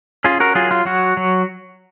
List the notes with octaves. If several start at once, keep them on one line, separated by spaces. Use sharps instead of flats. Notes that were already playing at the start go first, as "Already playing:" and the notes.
C#4 F4 G#4
F#4 A#4
F#3 F4 G#4
F4
F#3 F#4
F#3